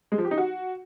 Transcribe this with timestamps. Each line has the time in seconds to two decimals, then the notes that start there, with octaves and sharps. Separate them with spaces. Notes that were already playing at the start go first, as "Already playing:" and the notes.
0.12 G#3
0.18 F3
0.25 G4
0.31 D#4
0.38 F#4